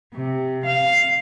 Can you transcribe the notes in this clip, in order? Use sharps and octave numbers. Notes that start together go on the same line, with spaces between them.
C3
F5